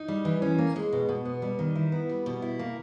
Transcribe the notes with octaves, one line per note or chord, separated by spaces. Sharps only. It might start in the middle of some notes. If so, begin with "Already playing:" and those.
Already playing: D#4
G3
E3
C#4
A#3
G#3
B2
B2
B3
G3
D#3
E4
B3
G3
B2
E4
A#3